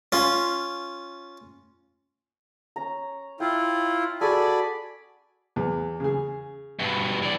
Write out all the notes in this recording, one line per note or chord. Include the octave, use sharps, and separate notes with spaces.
C#4 F4
C#4 A#5
E4 F4 G5
F#4 G#4 A4 D5 G#5 B5
E2
C#3 G#4
G2 B2
E3 D5